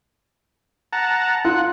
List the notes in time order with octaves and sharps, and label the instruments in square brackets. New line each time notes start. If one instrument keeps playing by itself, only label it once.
[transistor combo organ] F#5 A5 A#5
[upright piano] F4 [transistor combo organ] F#5